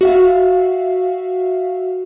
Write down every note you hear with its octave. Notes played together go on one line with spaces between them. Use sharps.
F#4 E5 F5